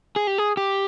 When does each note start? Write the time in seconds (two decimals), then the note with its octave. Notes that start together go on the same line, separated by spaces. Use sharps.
0.16 G#4
0.27 G4
0.38 G#4
0.57 G4